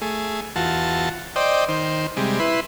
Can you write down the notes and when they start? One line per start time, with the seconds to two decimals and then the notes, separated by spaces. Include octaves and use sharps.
0.02 A3 G#4
0.56 E2 F4 F#4 A5
1.36 C5 D5 D#5 G5
1.68 D#3 C5
2.17 C3 G3 G#3
2.40 E4 B4 C6